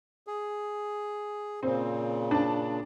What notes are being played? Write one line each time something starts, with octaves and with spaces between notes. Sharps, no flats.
G#4
A#2 C#3 C4
D4 A5